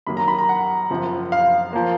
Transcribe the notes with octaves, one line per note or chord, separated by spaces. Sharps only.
F#2 D#3 F#3 A#3 B5
A#5
B5
A#5
F#5
F#1 F#2 F3
F5
F3 A#3